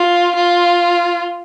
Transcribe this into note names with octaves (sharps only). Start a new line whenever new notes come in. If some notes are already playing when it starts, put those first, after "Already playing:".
Already playing: F4
F4